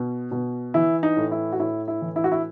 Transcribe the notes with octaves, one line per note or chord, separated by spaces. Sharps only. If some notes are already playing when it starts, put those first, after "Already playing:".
Already playing: B2
B2
E3 E4
D#4
A2
E4
F#4
A2 E4
E4
E3
E4
F#4
E4